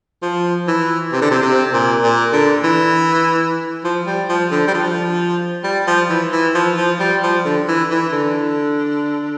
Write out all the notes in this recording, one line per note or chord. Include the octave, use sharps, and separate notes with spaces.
F3
E3
C3
D3
C3
C3
A#2
A#2
D3
E3
F3
G3
F3
D3
G3
F3
G3
F3
E3
E3
F3
F3
G3
F3
D3
E3
E3
D3